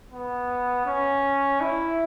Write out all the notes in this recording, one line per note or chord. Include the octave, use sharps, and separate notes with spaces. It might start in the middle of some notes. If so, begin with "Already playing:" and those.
B3
C#4
E4